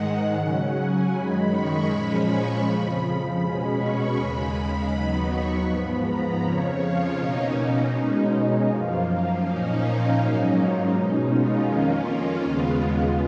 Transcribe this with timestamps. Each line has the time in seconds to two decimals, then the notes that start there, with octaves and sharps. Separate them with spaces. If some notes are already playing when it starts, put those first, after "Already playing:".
Already playing: G#2 D#3 G#3 F#5
0.37 C#3 F#3 C#4
0.75 G#5
1.13 F#2 D#3 G#3 B5
1.50 C#6
1.87 A#2 F3 G#3 C#4 B5
2.26 C#6
2.62 F2 C#3 F3 B5
3.39 B2 G#3 C#4
3.76 C#6
4.13 D#2 C#3 G#3 B5
4.50 B5
4.89 D#2 D#3 F#3 B3
5.27 C#6
5.63 G#2 F3 B3 B5
6.01 A#5
6.38 F2 C#3 F3 C#5
6.77 F4
7.14 B2 A#3 C#4 D#4
7.53 D#4
7.90 B2 G#3 C#4
8.65 F#2 F3 A#3 F4
9.02 F4
9.39 A#2 F3 A#3 C#4 D#4
9.78 F4
10.15 G#2 F#3 A#3 C#4 D#4
10.52 F4
10.90 B2 G#3 C#4 D#4
11.29 F4
11.65 F2 D#3 A#3 C#4 F4
12.41 D#2 C#3 G#3 B3